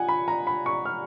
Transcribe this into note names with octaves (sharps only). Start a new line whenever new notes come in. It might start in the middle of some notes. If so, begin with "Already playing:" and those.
Already playing: F3 F#5 G#5
B5
A#5
B5
C#6
F6